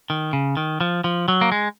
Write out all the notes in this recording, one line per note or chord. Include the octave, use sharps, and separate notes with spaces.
D#3
C#3
D#3
F3
F3
F#3
A#3
G#3